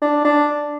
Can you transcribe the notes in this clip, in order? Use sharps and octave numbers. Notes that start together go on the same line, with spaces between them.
D4
D4